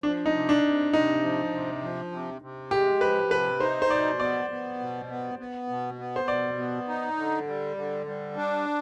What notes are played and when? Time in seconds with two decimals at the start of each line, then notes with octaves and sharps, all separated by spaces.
0.03 F3 D4
0.26 D#4
0.34 C3
0.49 D4
0.63 C3
0.93 C3 D#4
1.23 F3
1.53 C3
1.82 F3
2.12 C3
2.42 C3
2.71 G#3 G4
3.01 F3 B4
3.31 C3 B4
3.60 D#4 C5
3.82 C5
3.90 B2 D5
4.20 B3 D5
4.50 B3
4.79 B2
5.09 B3
5.39 B3
5.68 B2
5.99 B3
6.16 C5
6.28 B2 D5
6.58 B3
6.88 D#4
7.17 D3
7.47 G3
7.77 D3
8.06 G3
8.36 D4